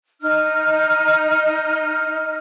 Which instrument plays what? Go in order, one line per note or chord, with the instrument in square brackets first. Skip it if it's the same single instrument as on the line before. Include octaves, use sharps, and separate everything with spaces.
[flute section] D#4 F6